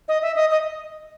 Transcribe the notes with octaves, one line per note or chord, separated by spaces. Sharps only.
D#5
E5
D#5
D#5